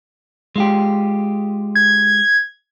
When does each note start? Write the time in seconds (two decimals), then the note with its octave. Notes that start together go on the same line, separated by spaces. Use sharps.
0.56 G#3 F4 G4
1.75 G#6